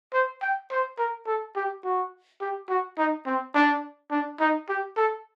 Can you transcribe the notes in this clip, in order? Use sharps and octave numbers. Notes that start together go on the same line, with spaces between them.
C5
G5
C5
A#4
A4
G4
F#4
G4
F#4
D#4
C4
D4
D4
D#4
G4
A4